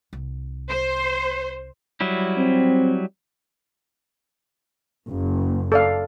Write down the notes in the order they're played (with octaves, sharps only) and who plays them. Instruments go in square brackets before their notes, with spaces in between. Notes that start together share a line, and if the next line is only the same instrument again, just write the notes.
[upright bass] C2
[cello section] C5
[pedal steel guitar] F#3 G3 E4
[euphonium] C4
[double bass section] F#1
[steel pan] A4 D5 F5